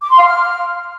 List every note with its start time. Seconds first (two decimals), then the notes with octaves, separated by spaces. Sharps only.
0.02 D6
0.10 C6
0.17 F5
0.25 F6